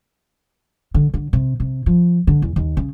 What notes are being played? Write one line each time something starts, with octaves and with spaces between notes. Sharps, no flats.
D3
D3
C3
C3
F3
D3
E2
D#2
C#3